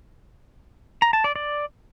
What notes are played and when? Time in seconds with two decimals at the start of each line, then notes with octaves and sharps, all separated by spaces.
1.02 A#5
1.13 A5
1.24 D5
1.36 D5